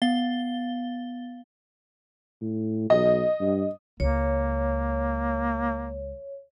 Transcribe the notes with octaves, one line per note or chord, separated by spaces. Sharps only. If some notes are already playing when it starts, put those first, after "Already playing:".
B3 F5 A6 G7
A2
B1 D#5
G2
C#2 A#3 C#5